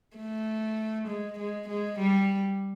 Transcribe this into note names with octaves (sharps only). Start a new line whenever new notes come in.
A3
G#3
G#3
G#3
G3